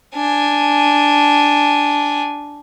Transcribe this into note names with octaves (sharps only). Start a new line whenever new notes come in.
D4 G#5